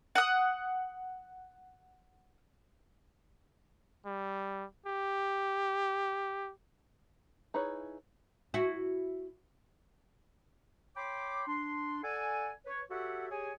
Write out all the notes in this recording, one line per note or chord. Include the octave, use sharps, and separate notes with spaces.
F#5 D#6
G3
G4
D#4 E4 G#4 B4 C#5
E4 F#4
C#5 G5 B5 C6 D6
D4 C6
A4 D5 F#5 G#5
B4 C#5
F#4 G4 A4 C#5 E5 F#5
G4 G#4 C#5 D#5 G#5